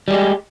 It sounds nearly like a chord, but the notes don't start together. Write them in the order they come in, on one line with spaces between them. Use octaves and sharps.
G3 G#3 G4